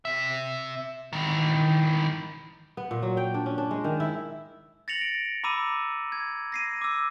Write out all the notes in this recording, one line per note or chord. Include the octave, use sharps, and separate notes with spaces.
C3 E5
D#3 E3
B3
A#2
F#3
G5
D4
C#4
D4
G#3
D#3
E4
A6 A#6 C#7 F7 F#7
D7
A#5 B5 D6 E6 D#7
G#6
A#6 C7 D#7
D6 E6